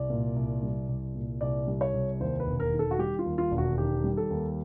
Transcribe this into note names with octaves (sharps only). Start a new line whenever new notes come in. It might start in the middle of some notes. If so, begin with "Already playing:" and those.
Already playing: C2 D5
A#2
C2
G3
C2
A#2
C2 D5
G3
C#5
C2
D#2 C5
B4
E1
A#4
D#3
A4
F#4
G3 G4
F4
D#2
F4
E1
F#4
D#3 G4
G3
A4
D#2